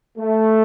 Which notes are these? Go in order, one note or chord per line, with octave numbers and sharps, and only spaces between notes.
A3